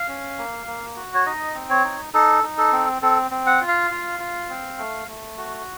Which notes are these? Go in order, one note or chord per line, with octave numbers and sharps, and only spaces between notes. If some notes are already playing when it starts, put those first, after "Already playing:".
Already playing: F5
C#4
A#3
A#3
F#4
C#5
D#4 D#5
C4
C#5
D#4
D#4 A4
D#4
A4
C4
C4 A4
C4
F#5
F4
F5
F4
F4
C4
A3
A3
F#4